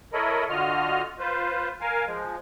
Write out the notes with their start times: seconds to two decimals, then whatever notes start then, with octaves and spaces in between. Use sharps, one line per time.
0.13 E4 A4 A#4 C#5 D#5 B5
0.49 D3 F4 F#4 D#5 F6
1.19 F4 B4 C5
1.81 A#4 F5 G#5
2.07 F3 G#3